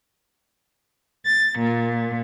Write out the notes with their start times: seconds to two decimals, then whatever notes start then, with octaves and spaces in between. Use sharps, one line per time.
1.24 A6
1.58 A#2